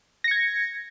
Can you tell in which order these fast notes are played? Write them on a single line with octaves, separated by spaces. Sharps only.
A#6 C#7 G#6